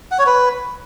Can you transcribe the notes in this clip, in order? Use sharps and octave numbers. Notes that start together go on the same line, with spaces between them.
F#5
C#5
B4